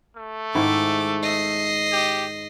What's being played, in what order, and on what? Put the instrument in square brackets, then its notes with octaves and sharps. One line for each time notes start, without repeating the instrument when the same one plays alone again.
[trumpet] A3
[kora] G#2 D#3 E4 [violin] D6
[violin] D#5 C7
[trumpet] G4